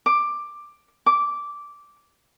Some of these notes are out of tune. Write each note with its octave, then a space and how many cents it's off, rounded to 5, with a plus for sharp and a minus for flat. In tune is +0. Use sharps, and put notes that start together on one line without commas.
D6 +10
D6 -10